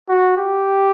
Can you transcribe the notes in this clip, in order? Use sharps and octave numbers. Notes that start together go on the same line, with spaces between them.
F#4
G4